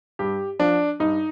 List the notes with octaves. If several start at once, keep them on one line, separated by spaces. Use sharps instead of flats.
G2 G4
F3 D4
G2 D#4